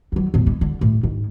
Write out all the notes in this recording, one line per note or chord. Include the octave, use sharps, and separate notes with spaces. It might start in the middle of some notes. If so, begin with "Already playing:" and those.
E3 F#3
E2 A2
G#3
D3
A2
G#2